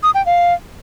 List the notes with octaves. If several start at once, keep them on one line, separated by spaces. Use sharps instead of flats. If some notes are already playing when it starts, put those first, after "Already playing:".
D#6
G5
F5